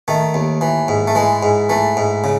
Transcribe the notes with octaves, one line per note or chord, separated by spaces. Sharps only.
D#3 A3
D#2
E3
G#2
A3
E3 G#3
G#2
E3 A3
G#2
C#3